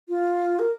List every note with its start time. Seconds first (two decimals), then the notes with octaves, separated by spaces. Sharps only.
0.09 F4
0.59 A#4